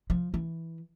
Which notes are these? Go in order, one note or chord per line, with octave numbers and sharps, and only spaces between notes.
F3
E3